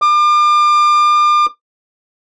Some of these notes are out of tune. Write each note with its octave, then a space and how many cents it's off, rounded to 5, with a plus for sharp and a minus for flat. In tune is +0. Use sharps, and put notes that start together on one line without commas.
D6 +35